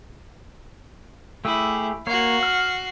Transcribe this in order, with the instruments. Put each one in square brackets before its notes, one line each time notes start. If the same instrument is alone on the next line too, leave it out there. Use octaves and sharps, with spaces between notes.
[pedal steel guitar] A3 G4 G#4 [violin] E4
[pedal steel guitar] A#3 C#5 [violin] F#4 C7
[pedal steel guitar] F6